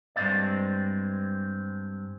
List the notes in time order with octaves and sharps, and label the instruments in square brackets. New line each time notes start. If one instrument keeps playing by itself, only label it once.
[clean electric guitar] G2 A#2 G#3 C4 D5